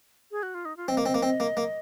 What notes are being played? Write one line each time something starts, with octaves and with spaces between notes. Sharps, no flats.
G#4
F#4
F4
D#4
F4
C4 D#5
A#3
C4
A#3
C4
A#3
A#3